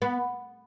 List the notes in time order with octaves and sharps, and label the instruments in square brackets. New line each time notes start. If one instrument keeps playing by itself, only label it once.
[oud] B3